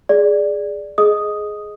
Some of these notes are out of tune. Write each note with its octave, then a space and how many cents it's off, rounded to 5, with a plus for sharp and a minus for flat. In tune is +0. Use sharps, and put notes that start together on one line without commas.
G#4 +0 D5 +0
G#4 +15 D#5 +0 D#6 +0